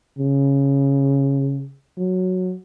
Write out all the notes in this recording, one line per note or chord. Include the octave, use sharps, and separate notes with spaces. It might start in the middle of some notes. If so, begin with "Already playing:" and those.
C#3
F#3